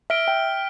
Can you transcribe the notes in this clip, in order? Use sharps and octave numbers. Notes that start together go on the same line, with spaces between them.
E5 F6 B6 D7 G7
G5